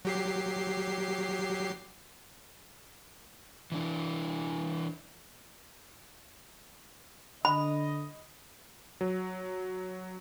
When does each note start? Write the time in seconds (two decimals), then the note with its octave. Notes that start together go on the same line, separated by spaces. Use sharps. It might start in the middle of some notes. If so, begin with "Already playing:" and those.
0.05 F#3 G4 C7
3.72 E3 D4 E4
7.45 D3 D#5 B5
9.01 F#3